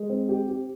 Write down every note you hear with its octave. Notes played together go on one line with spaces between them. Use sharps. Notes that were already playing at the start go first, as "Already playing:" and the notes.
Already playing: G#3
C4
G4
G4